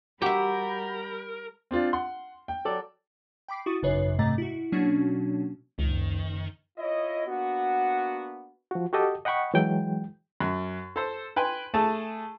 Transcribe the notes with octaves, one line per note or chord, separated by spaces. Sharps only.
G3 F#4 G4 A#4 E5 B5 G6
C4 D4 F4
F#5 C6
G5
F#3 A4 D5
G5 B5 D6 B6 C7
E4 F#4 C#6 D#6 A6 D#7
G#1 F#2 C#3 B4 C#5 C7
G#2 C3 A3 D#5 A#5 A6
E4 F#4
B2 F#3 A#3 C#4 D4 F#4
F#1 C#2 D#3
E4 F4 C#5 D#5
A#3 B3 D4 F#4
F3 F#4
F#4 G4 A4 D#5 G5
D#5 F#5 G5 B5 C#6
E3 F#3 G#3 G5
F#2
A4 C5
B4 G5 G#5 C6
A3 G#4 A5